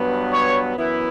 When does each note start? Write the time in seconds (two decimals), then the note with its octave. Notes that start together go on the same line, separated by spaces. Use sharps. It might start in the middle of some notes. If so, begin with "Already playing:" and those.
Already playing: G2 F#3 B3
0.32 C#5
0.77 F#2 E3 B3 E4 B4